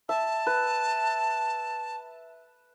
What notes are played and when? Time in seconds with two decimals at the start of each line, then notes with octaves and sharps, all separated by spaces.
0.09 E5 A5
0.47 B4